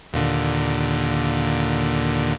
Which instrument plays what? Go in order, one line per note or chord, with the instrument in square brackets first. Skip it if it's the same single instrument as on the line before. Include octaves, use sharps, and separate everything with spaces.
[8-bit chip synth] D#2 A#2 D3